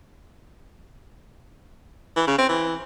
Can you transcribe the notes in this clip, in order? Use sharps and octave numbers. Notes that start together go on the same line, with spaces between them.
E3
C#3
C4
E3